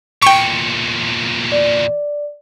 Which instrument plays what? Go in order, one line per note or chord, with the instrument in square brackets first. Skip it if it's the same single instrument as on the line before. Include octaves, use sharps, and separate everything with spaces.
[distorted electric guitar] E2 A#2 [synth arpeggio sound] G5 C#6 [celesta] C#7
[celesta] D5